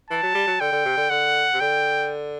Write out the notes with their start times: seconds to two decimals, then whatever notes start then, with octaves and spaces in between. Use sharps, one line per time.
0.10 E3 A5
0.23 F#3
0.35 G3
0.47 F#3
0.60 D3 G5
0.72 D3
0.85 C3
0.97 D3
1.10 D3 F#5
1.54 C3
1.60 D3 G5